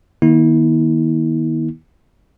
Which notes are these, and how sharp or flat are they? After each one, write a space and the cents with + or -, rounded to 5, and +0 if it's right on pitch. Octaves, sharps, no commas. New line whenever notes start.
D#3 +0 A#3 +45 E4 -40